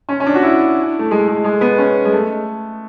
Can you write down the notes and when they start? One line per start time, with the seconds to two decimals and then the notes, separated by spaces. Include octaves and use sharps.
0.09 C#4
0.20 C#4
0.26 D4
0.35 F#4
0.43 E4
0.99 A3
1.11 G#3
1.28 G#3
1.44 G#3
1.61 B3
1.78 C#4
2.05 G#3
2.12 A3